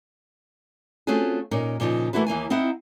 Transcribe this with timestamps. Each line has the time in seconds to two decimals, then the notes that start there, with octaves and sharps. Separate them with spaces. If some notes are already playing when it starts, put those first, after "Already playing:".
1.07 A3 C4 C#4 F4 F#4 G#4
1.51 A#2 C#4 D#4 A#4
1.80 A#2 C#3 F3 D#4
2.13 E3 A3 A#3 E4 F#4 B4
2.27 D#2 E3 A#3 G#5
2.50 C4 D#4 E4 F#5